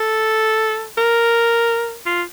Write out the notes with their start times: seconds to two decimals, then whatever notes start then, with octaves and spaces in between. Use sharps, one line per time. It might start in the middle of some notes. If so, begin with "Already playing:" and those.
Already playing: A4
0.98 A#4
2.06 F4